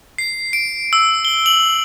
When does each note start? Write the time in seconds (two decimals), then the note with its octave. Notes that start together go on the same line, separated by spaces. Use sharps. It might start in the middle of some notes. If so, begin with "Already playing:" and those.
0.18 C7
0.53 D7
0.93 E6
1.25 G7
1.46 F#7